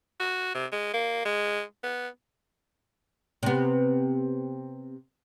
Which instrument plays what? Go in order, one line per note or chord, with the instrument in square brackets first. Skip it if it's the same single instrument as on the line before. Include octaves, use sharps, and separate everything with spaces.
[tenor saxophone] F#4
C3
G#3
A#3
G#3
B3
[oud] C3 B3